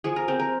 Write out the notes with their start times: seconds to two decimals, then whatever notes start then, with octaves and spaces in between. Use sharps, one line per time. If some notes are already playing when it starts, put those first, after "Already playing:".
0.04 F3 G#4
0.16 A#4
0.28 C4 A#4
0.40 A#4